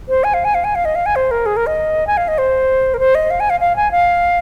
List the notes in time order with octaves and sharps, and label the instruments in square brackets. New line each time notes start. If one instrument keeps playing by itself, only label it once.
[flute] C5
G#5
F5
G#5
F5
G#5
F5
D#5
F5
G#5
C5
A#4
G#4
A#4
D#5
G#5
F5
D#5
C5
A#4
C5
D#5
F5
G#5
F5
F5
G#5
F5